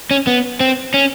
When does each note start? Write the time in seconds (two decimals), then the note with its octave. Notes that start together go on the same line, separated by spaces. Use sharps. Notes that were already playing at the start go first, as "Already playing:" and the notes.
0.11 C#4
0.27 B3
0.60 C4
0.94 C#4